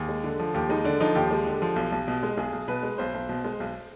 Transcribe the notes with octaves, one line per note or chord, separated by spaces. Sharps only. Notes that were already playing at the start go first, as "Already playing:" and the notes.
Already playing: D#2 G#4
G#3
D3
F3
D#2 G4
G#3 D#4
D3 D4
F3 D#4
D#2 G4
G#3
D3
F3
B1
B1
B2
G#3
B1 G#4
B1
B2 B4
G#3
B1 C5
B1
B2
G#3
B1